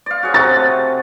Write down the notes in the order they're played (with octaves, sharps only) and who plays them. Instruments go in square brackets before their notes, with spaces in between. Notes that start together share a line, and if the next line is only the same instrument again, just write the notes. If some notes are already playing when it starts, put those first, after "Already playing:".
[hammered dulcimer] D5 F5
F#4 G#4 C#5
[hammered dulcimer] C3 [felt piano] A6
[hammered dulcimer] A3